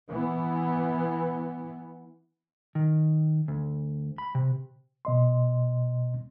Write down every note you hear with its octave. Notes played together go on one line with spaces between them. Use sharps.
E3 B3
D#3
D2
B5
C3
B2 D#5 C6